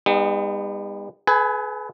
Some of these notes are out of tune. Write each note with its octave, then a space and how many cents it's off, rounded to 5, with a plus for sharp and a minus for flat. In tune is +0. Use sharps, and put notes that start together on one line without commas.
G3 +45 B3 +0 D#4 +0
G#4 +45 B4 +15 G#5 +0